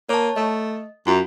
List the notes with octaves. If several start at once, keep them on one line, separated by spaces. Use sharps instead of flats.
A#3 C#5 A5
A3 D#5
F#2 F4